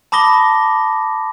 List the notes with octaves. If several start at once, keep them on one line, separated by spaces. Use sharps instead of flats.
A5 B5 D6 D#6 A#6 G7